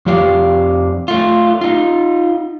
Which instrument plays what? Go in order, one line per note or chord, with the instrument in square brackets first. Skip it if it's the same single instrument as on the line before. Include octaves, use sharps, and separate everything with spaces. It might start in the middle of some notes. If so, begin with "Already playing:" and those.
[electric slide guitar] F2 F3 G4 D5 F5
A3 F4
D#4 F4